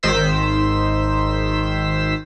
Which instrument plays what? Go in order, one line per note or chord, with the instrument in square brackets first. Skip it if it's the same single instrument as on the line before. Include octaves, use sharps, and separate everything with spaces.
[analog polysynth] G#1 D#3 C5 E6 B6